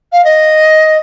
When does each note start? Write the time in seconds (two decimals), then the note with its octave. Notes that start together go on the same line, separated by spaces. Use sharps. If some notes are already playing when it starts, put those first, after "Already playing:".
0.12 F5
0.24 D#5